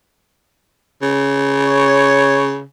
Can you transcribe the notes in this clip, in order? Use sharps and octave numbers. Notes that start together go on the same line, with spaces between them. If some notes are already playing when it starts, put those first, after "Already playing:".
C#3
C#5